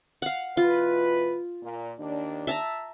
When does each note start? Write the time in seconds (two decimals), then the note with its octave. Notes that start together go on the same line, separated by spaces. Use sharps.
0.22 F5 F#5
0.57 B2 E3 F4 B4
1.62 A#2
1.99 D#2 D#3 D4
2.47 E5 A5 A#5